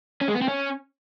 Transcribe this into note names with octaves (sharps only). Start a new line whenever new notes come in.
C#4
G#3
B3
C4
C#4